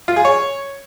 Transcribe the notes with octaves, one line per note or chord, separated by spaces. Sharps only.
F4
G#4
C#5